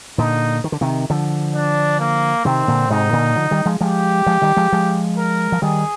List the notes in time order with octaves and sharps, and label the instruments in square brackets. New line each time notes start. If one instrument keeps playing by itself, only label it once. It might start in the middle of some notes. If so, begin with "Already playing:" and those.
[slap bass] A#2 D3 [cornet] D#4
[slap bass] D#3
D3
C3 D#3
D3 F3
[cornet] D4
A#3
[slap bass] C3 D#3 [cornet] C4
[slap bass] A#2 D3
[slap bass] G#2 C3 [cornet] D#4
[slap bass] A#2 D3
D3 F3
D#3 G3
F3 G#3
[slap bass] F3 G#3 [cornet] G4
[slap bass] F3 G#3
D#3 G3
F3 G#3
F3 G#3
[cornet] A#4
[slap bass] F3
[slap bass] D#3 G3 [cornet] G#4